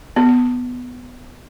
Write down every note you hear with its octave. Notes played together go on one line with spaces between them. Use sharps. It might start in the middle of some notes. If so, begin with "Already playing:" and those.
B3